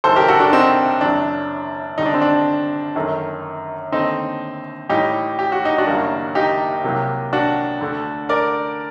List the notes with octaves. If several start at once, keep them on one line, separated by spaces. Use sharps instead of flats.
F#1 F#2 D#3 A4 C5
G4 A#4
F#4 A4
D4 F#4
C4 D#4
F#1 F#2 F#3 D4
G1 G2 D3 G3 D#4
D4
C4
D4
G1 F#2 D#3 A3
D#2 D3 A3 C4 D#4
A1 A2 G3 D#4 G4
G4
F#4
D#4
D4 F#4
F#1 F#2 D#3 G3 A#3
D#4 G4
C2 C3 F#3 A#3
D4 F#4
D2 D3 A3
A#4 D5